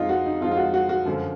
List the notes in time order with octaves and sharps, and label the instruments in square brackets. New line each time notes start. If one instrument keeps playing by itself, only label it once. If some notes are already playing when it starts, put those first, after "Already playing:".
Already playing: [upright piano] F2 F3 G#3 D#4 F4
F#4
D#4
F2 F3 G#3 F4
F4
F#4
F#4
F#4
F#2 D3 F3